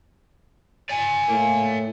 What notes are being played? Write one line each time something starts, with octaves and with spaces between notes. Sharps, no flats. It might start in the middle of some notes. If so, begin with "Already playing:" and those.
D5 G#5
A2 A#3